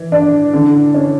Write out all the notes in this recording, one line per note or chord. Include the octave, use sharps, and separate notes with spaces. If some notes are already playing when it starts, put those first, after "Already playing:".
Already playing: E3
D4
D3
C#4